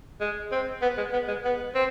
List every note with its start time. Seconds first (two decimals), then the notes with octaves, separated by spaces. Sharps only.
0.20 G#3
0.52 C4
0.82 B3
0.98 G#3
1.13 B3
1.28 G#3
1.44 B3
1.75 C4